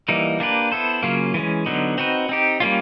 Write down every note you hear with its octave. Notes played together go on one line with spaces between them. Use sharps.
E3 G3 A#3 D#4
A#3 D4 G4 B4
B3 E4 A4 C5
C#3 F#3 A#3 C#4 F4
E3 G#3 C#4
D3 F#3 B3 D#4
C4 D#4 F#4 B4
C4 D#4 G4
G3 A#3 C#4 F4